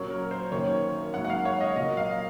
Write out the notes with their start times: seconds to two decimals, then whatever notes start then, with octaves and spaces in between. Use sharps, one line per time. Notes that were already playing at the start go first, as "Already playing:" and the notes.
Already playing: A#2 F#3 A#3 C#4 C#5
0.10 A#4
0.31 C5
0.52 F#2 D#3 A#3 C#4 C#5
1.14 G#2 F#3 A#3 F#5
1.25 F#5
1.30 F5
1.45 C#5
1.61 D#5
1.76 A#2 F#3 A#3 D#5
1.97 F5